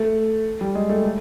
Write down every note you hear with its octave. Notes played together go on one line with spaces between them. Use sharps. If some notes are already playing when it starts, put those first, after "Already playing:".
Already playing: A3
G3
G#3
A3
A3